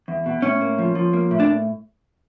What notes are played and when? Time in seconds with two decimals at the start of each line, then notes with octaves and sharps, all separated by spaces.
0.08 E2
0.26 B2
0.42 A2 C#4
0.61 A#3
0.78 F3
0.95 F3
1.13 A#3
1.31 A2
1.40 D4